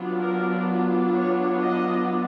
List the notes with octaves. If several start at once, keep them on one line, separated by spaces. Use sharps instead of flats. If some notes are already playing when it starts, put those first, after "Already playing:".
Already playing: F#3 B3 D4 F4
A#4
C#5
D#5